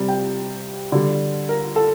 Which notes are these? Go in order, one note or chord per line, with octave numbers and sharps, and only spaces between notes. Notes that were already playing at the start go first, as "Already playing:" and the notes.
Already playing: C3 G3
G5
D3 G3
A#4
A4